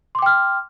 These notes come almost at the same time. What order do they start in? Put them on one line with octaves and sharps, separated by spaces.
C6 D6 G5 F6